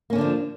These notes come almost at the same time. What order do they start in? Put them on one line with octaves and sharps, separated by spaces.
A#3 C#4 D3 D4 F3